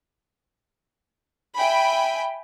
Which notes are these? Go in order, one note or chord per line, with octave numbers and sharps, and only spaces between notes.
E5 G5 G#5 B5